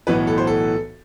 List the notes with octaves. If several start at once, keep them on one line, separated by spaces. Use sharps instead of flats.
B1 A2 E3 B3 B4
A4
C5
A4